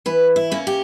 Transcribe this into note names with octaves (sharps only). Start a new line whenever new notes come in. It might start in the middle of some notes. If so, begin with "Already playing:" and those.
E3 B4
E4
A#3 C#4
G4